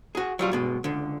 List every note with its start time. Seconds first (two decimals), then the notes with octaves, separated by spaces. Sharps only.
0.15 F#4 G#4
0.39 F#3 G3 F4
0.52 G2 B2 G#3
0.84 C#2 D3